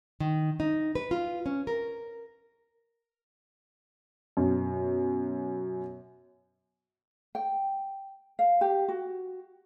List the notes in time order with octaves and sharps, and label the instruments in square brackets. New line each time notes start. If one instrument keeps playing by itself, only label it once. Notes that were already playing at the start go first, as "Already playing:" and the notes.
[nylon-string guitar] D#3
D#4
B4
F4
C#4
A#4
[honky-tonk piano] F#2 B2
[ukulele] G5
F5
G4
F#4